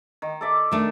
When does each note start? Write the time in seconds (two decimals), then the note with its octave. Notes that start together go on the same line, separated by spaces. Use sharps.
0.22 D#3
0.41 A4 D5 E5
0.72 D#3 A3 D4